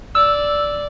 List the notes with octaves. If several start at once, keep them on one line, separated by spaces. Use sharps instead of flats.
D5 E6